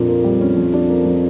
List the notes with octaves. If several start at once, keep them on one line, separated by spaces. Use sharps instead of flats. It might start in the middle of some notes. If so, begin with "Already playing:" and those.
Already playing: F2 A#2 D4
A#3
G3
C#4
F3
D4
A#3
F3